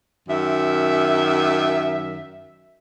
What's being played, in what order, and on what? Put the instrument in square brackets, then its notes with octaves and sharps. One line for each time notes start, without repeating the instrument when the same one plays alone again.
[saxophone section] F#2 D#3 E5